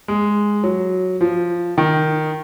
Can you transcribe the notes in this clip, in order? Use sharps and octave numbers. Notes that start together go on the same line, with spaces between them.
G#3
F#3
F3
D#3